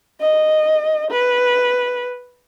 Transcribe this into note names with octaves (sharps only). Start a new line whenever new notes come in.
D#5
B4